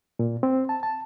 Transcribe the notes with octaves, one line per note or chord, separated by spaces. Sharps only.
A#2
C4
A5
A5